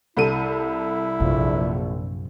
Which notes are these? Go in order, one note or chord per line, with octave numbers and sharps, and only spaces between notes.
C2 E4 A4 D#7
A#1 F#2 C3